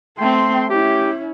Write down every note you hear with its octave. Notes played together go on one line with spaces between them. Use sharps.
A3 C4 G5 C6
A3 C#4 E4 G4